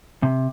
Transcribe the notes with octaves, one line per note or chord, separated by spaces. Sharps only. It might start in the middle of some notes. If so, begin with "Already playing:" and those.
C3